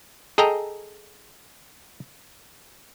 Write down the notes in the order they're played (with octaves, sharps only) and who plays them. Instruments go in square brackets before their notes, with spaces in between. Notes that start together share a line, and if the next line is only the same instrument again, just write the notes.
[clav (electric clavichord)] G#4 A4 D#5 G5 A#5